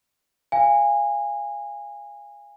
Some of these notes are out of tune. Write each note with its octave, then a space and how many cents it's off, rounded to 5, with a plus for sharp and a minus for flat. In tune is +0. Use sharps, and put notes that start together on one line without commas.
F5 -15 G#5 -25